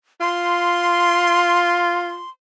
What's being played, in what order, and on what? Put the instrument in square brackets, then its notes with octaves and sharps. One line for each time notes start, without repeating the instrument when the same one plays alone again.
[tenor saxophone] F4 [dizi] C6